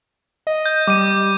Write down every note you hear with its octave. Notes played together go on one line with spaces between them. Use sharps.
D#5
G6
G3 D6 D#7